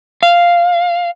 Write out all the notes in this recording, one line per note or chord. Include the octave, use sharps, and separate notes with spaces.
F5